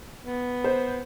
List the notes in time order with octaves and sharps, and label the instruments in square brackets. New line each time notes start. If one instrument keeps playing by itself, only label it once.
[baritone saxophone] B3
[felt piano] C5